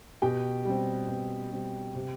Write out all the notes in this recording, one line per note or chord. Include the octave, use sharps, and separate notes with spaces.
B2 G4 G5
G3 C4
B2
G3 C4
C3